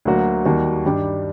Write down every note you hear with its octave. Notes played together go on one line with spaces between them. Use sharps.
D2 D3 F#3 A#3 F#4
D#2 D#3 G3 A#3 F#4
G2 D#3 G3 D4 G4